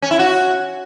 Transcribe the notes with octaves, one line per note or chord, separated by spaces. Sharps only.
C#4
E4
F#4